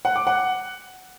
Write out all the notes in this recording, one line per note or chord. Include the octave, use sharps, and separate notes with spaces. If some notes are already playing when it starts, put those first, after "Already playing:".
F#5
D6
F#5